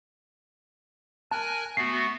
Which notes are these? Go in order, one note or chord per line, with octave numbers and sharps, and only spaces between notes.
A#4 G#5 A5 F#6
A3 B3 F#4 C7